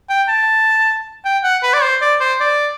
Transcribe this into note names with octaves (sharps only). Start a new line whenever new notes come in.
G5
A5
G5
F#5
B4
D5
C5
D5
C5
D5